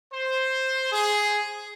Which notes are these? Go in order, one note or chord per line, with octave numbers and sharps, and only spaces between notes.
C5
G#4